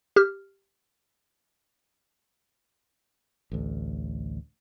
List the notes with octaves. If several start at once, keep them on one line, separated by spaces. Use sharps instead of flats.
G4 F6
A1 D2